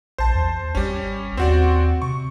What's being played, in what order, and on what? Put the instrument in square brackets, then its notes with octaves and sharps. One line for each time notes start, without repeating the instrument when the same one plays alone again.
[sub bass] A#1 [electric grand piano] C5 A5
[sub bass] E2
[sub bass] G#1 [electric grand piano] G3 C#4
[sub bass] D#2 [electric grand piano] C4 F#4 D5
[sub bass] C3 [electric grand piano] C#6